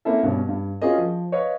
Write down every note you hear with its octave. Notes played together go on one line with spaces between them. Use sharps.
A#3 C4 C#4 E4 A4 E5
G2 B2 C#4
G2
C#4 F4 F#4 G#4 A#4 D#5
F3
B4 C#5 D#5 F5